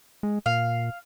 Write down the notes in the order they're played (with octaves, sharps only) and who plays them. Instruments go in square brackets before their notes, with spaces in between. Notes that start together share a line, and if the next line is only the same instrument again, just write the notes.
[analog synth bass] G#3
[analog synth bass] A#2 [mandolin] F5